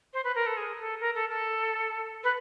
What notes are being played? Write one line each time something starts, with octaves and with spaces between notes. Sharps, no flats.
C5
B4
A#4
A4
G#4
A4
A#4
A4
A4
B4